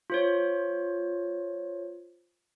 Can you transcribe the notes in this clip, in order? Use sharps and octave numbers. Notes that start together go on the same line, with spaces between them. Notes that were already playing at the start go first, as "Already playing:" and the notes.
F4 C5 C#5